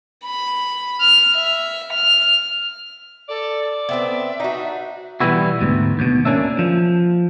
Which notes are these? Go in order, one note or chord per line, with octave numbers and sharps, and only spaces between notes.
B5
F6
E5
F6
A4 D5
B3 C4 A4 E5
D4 D#4 F#4
B2 E3 G3 B3 E4 F#4
D2 G#2 B2
D#2 B2
A#3 C#4 D4 E5
F3